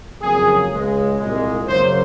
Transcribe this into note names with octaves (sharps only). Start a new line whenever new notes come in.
F2 C#3 F#3 A#3 G#4
C#2 C#3 G#3
C2 A#2 G#3
F#2 C#3 F#3 A#3 C5